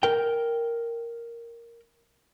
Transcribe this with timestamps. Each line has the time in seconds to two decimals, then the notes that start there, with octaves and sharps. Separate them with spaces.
0.03 A#4 G5